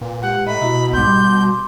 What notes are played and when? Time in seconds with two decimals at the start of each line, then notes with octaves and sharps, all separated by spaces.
0.01 A#2 B4
0.22 G#3 G4 F#5
0.46 A2 D#5 E5 A#5 B5
0.61 B2 E4 F#4
0.93 B1 G#2 C6 D6 G6
1.07 G3